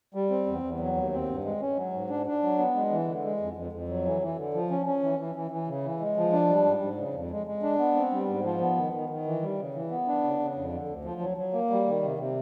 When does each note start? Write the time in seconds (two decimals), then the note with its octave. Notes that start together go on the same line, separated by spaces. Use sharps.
0.14 G3
0.30 C4
0.47 E2
0.63 E2
0.80 F#3
0.96 D#2
1.13 C4
1.29 G2
1.44 G#3
1.61 C#4
1.77 F#3
1.93 G#2
2.10 D4
2.26 D4
2.43 F#3
2.58 B3
2.75 G#3
2.91 E3
3.07 D3
3.24 G#3
3.40 F2
3.56 F2
3.72 F2
3.89 F#3
4.05 E3
4.22 E3
4.37 D3
4.54 F3
4.71 C#4
4.87 C#4
5.03 E3
5.19 E3
5.35 E3
5.51 E3
5.68 C#3
5.84 E3
6.00 G#3
6.17 F3
6.33 D4
6.49 G3
6.65 G#2
6.82 G#2
6.98 C#3
7.14 F2
7.31 G#3
7.47 G#3
7.63 D4
7.79 B3
7.96 C4
8.12 G3
8.28 G#2
8.44 F3
8.61 B3
8.77 D#3
8.93 D#3
9.10 D#3
9.25 E3
9.42 G3
9.59 C#3
9.75 E3
9.91 B3
10.08 D4
10.24 C#3
10.40 C#3
10.55 F2
10.73 D3
10.88 D2
11.05 F3
11.21 F#3
11.38 F#3
11.53 A#3
11.70 G3
11.86 D#3
12.03 C3
12.19 C3